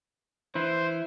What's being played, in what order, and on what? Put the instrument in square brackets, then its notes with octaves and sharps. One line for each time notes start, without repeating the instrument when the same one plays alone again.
[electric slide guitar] E3 E4 [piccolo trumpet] C5